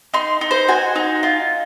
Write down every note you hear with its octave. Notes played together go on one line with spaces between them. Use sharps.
D#4 C6
D#4
C5
F#4 G#5
D#4
F4